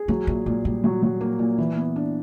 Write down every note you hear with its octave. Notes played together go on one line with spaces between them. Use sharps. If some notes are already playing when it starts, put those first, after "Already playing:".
Already playing: G#4
F#3 A3
A#2 A3
A#2 G#3
A#2 G3
F#3
F#3
A#3
A#2
E3
B3
D4